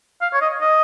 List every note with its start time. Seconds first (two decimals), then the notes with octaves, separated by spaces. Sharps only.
0.22 F5
0.33 C#5
0.42 D#5
0.61 D#5